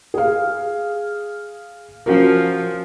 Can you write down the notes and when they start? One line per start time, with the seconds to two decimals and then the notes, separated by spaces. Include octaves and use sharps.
0.14 G#4 F5
2.06 F3 C#4 F#4 A#4